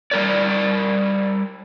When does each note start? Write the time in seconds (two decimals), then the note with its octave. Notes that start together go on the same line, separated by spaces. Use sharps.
0.11 G3 A#4 D5